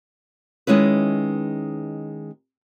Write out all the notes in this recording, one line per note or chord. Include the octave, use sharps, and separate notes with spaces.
D#3 G#3 C#4 E4 B4